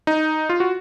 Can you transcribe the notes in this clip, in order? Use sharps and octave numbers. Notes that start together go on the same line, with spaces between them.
D#4
F4
F#4